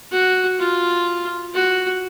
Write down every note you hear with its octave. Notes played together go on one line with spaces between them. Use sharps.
F#4
F4
F#4